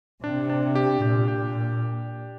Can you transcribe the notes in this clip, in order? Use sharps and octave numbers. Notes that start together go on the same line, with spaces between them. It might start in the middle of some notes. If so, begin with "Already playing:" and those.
C3 D4
D4
G4
A#2 G4
G4